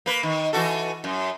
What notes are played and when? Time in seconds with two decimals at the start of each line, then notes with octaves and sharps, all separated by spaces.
0.06 A#3 B4
0.23 D#3
0.53 E3 F#4 A4
1.04 F#2